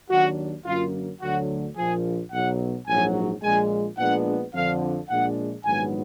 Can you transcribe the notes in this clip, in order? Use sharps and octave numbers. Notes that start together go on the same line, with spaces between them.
D#2 D#3 F#3 D4 F#4
F#2 D3 F#3 A#3 F4
D2 D3 F#3 F#4
A#1 A#2 F3 G#4
B1 B2 F#3 F#5
A#1 G#2 F#3 G#5
A#1 A#2 G#3 G#5
A#1 A#2 G#3 B3 D4 F#5
F2 D3 F3 F5
A#1 A#2 G#3 D4 F#5
A#1 G#2 D#3 F#3 B3 G#5